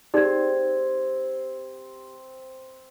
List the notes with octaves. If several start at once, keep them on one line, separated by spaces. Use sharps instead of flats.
C4 D#4 G4 G#4 D5 G#6